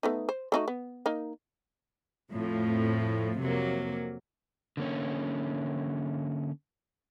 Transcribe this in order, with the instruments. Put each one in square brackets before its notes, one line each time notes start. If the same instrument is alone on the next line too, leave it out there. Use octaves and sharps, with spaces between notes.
[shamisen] A3 B3 D#4
C5
A3 D#4 F#4
B3
A#3 D#4
[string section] F2 A2 F3
F2 C3 F#3 A#3
[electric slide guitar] D3 A#3 C#4